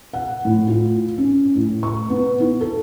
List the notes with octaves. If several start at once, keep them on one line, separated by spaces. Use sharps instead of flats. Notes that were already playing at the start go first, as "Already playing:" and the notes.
F#5
A2
F4
C#4
A2
C#6
B3
E4
A4